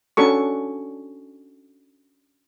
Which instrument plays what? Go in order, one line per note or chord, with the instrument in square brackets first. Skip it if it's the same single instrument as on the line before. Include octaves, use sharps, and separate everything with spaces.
[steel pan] C#4 D4 F#4 A4 C#6